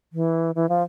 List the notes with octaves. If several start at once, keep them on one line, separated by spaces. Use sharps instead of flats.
E3
E3
F3